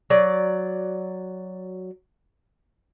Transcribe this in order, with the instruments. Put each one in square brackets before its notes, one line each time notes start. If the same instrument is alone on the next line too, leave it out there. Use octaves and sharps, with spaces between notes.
[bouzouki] F#3 D5